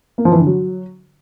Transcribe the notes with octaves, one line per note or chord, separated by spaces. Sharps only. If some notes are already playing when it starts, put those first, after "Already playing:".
A#3
F3
E3
D3
F#3